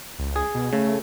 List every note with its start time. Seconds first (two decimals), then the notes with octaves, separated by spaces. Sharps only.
0.18 C#2
0.36 G#4
0.54 B2
0.73 C#3 A3